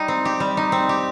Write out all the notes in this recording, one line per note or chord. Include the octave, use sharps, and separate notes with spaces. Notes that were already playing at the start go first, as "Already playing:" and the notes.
Already playing: G3 D#4
C4
G4
G3
D#4
C4
G4